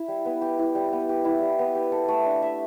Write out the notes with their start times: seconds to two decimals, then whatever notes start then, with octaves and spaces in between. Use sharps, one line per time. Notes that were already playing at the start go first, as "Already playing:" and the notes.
Already playing: E4
0.08 G3
0.25 B3
0.42 G4
0.59 E4
0.75 G3
0.93 B3
1.09 G4
1.25 E4
1.42 G3
1.59 B3
1.75 G4
1.92 A4
2.08 A3
2.26 D4
2.42 E5